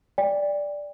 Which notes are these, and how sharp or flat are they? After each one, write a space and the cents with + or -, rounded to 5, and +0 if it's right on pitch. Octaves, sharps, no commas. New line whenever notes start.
D5 -5 G5 +30